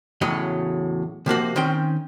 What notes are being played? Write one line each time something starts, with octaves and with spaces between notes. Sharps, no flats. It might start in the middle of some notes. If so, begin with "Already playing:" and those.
E2 A2 C#3 F#3 C#5 D#5
C3 F3 A#3 F#4
D#3 C4 C#4 G5